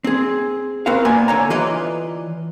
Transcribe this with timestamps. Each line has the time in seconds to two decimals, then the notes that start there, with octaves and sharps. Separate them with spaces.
0.04 C4 G#4
0.86 B3 C4 F#4 A#4 C5 F5
1.05 A#2 A#3 B3 D5 G#5
1.28 D3 C#5 A#5
1.50 E3 F4 B4 D5 D#5